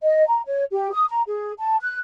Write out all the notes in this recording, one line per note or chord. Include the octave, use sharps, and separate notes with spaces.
D#5
A#5
C#5
G4
D#6
A#5
G#4
A5
F#6